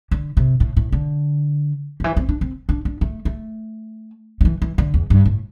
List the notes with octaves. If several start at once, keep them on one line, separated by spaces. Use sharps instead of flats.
D3
C3
A2
A2
D3
D3
E3
C4
D4
C4
D4
D4
A3
A3
D3
E3
E3
D3
E2
G2
A2